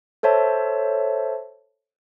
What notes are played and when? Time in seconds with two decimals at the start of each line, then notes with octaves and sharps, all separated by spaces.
0.23 A4 C5 C#5 E5 A5